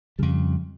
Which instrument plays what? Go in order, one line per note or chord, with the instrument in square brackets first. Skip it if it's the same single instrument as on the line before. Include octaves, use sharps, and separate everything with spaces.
[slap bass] F2 C#3 G3